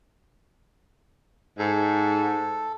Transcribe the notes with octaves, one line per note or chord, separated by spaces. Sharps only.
G#2 A4